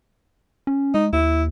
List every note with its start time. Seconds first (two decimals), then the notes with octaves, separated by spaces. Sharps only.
0.67 C#4
0.94 G#3 D#4
1.13 D#2 E4